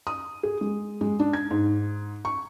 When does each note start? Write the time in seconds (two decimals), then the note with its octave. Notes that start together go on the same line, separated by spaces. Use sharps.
0.07 D#6
0.43 G#4
0.61 G#3
1.01 G#3
1.19 D4
1.33 G#6
1.50 G#2
2.25 C#6